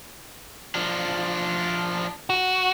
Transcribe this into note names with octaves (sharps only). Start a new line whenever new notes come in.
F3 D4
F#4